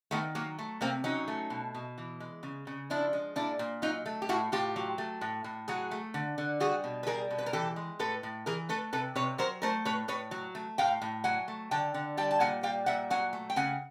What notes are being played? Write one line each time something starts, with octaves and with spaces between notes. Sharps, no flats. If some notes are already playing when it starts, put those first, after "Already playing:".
D#3 A3 B3
F#3 A#3
A3
C3 A#3 C4
F#3 C#4 D#4
A3
B2
B2
E3
G#3
C#3
C#3
F3 D4 E4
G#3
A#2 D4 E4
A#2
F#3 D#4 F4
A3
G4
A2 E4 F#4
A2 F4 G4
F#3
A3
A2
A2
F#3 F#4 G#4
A3
D3
D3
G3 F#4 G#4
B2
B4
G3 G#4 A#4
B2
B4
A#4
E3 G4 A4
G#3
A2 A4 B4
A2
E3 G#4 A#4
A3 A4 B4
C3 A4 B4
C3 B4 C#5
F#3 A#4 C5
A3 A#4 C5
A2 B4 C#5
A2 B4 C#5
F#3
A3
A2 F5 G5
A2
F#3 F#5 G#5
A3
D3 G5 A5
D3
G3 G5 A5
A5
A#2 F#5 G#5
G3 F5 G5
A#2 E5 F#5
F#3 F#5 G#5
A3
G5
C#3 F#5 G#5